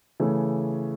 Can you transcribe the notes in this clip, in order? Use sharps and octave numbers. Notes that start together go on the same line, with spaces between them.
C#3 E3 A3